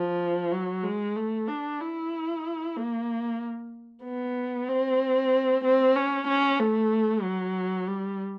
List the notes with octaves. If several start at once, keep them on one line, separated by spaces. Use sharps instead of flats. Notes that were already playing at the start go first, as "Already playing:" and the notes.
Already playing: F3
F#3
G#3
A3
D4
E4
A#3
B3
C4
C4
C#4
C#4
A3
F#3
G3